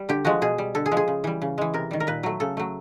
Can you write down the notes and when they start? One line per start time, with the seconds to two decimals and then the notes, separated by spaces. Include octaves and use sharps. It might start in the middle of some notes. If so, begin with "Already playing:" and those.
Already playing: G3
0.09 D3 G4
0.25 F3 G#3 F#4
0.42 B2 G#4
0.58 G3
0.75 D3 A4
0.86 G#4
0.92 F3 G#3
0.97 G#4
1.08 C#3
1.24 E3 G3
1.42 C#3
1.58 E3 G#3
1.74 C3 A#4
1.91 D#3 G3
2.00 A#4
2.07 A#2 B4
2.23 F#3 A3
2.40 C#3 A4
2.57 F#3 A3